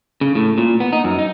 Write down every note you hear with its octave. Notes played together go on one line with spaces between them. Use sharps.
C#3
A2
A#2
B3
D#4
F#2
D#4